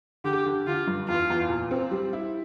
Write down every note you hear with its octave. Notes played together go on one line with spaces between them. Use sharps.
D3 G4
D3
D3 F4
G2
E2 F4
E2
A#2
C4
G3
E4